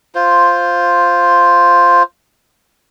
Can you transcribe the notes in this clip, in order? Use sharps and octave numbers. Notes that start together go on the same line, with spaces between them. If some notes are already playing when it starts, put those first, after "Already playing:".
F4 C5